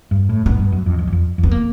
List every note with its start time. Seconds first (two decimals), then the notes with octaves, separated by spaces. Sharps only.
0.11 G2
0.29 A2
0.46 G#2 B3
0.60 G2
0.72 F#2
0.86 F2
0.99 F2
1.07 E2
1.12 F2
1.38 F2
1.43 B3
1.51 A#3